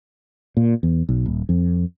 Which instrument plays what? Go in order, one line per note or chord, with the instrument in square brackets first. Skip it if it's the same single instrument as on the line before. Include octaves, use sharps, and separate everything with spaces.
[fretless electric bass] A#2
E2
B1
D#1
F2